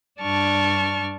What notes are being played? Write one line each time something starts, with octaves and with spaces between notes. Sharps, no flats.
G2 D4 A5 C#6 F6